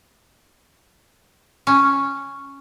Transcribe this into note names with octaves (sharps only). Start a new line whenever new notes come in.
C#4